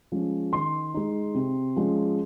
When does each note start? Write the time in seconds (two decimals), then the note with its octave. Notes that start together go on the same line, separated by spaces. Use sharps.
0.12 F3 G#3 C#4
0.53 D#3 C6
0.94 G#3 D#4
1.34 C3
1.76 F3 G#3 C#4